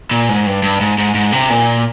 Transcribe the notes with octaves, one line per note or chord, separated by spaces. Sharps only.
A#2
G#2
G2
G2
G#2
G#2
G#2
C3
A#2